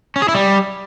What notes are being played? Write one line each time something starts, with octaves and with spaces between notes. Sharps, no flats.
C#4
G#4
E4
G3